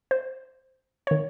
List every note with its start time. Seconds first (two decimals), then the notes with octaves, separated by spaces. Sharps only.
0.11 C5
1.07 D#3 C#5